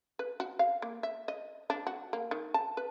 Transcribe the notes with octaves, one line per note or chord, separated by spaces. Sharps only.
B4
F#4
F5
A#3
E5
D#5
D4
F#4
A#3
D#3
A5
B4